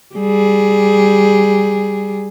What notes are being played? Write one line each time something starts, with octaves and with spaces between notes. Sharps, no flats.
G3 G#4